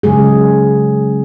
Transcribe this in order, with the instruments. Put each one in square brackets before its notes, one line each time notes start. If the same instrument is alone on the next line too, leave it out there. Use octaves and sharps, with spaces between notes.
[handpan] C#3 F#3 G#3 G#4